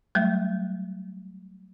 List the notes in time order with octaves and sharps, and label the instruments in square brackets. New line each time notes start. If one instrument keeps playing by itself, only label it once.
[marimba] F#3 G3 A3